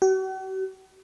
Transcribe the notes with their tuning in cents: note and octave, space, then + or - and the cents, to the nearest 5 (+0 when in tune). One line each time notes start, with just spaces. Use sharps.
F#4 +45